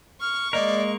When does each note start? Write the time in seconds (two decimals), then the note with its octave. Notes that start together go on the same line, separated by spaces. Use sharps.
0.21 C#6 F6
0.53 G#3 A#3 A#4 D5 D#5